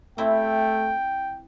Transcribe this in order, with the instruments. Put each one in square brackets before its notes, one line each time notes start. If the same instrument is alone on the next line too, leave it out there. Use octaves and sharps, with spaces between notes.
[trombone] A3 [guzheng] C4 E4 [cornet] G5